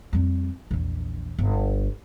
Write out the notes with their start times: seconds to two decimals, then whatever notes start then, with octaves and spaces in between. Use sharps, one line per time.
0.13 F2 G3
0.71 A#1 E2
1.38 G1